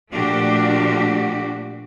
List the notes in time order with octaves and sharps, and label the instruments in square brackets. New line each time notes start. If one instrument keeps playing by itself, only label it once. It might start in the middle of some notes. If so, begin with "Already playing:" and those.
[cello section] A#2 F3 A3 D4 F#4 G4